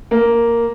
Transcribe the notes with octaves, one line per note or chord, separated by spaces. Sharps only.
A#3